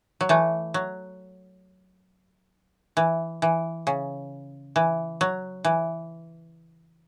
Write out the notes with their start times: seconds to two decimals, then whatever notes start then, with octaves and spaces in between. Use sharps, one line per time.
0.21 F#3
0.29 E3 A3
0.74 F#3
2.97 E3
3.42 E3
3.87 C#3
4.76 E3
5.21 F#3
5.65 E3